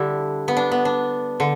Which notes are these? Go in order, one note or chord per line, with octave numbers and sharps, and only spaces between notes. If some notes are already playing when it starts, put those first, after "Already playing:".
Already playing: D3 G3 D4 E4
B3
D4
B3
D4
D3